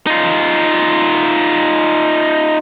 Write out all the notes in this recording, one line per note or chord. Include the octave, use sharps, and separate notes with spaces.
D#4 F4